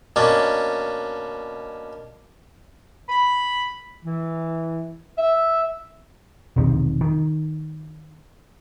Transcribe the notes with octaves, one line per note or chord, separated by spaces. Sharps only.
B2 A#3 C#4 D4
B5
E3
E5
E1 B1 C3 D#3
D#3